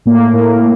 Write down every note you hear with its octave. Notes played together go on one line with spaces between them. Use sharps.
A2 A#3
A2